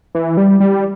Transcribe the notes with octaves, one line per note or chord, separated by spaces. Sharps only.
E3
G3
G3